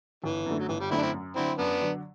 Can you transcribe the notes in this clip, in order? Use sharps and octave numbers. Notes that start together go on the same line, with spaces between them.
G1 E3
F#2 D3 A3
F#3
G1 E3
G3
F#2 D3 A3 C4 E4
D4
C4 E4
F#2
D3 F#3 C4 E4
F#2 B3 D4
D3 F#3